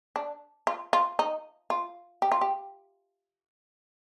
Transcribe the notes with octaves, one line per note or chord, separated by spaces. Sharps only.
D4
F4
F4
D#4
F4
G4
F4
G4